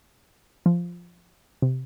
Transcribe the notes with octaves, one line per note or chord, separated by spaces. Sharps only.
F3
C3